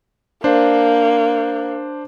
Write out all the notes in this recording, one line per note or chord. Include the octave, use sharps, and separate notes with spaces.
A#3 D4 C5